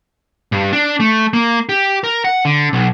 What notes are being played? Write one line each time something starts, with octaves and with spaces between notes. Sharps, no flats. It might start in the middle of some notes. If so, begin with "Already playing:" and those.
G2
D4
A3
A#3
G4
A#4
F#5
D3
B1